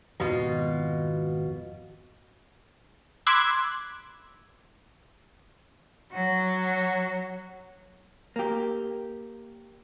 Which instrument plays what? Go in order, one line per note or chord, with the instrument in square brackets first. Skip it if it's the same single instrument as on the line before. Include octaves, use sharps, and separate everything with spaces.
[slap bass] G#1 F2 D#3 [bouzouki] B2 F4
[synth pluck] B5 C6 D6 E6 F#6 G#6
[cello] F#3 F#4
[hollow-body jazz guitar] A#3 G4